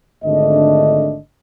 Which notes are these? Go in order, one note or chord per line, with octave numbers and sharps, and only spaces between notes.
G#1 D3 A3 D4 D#5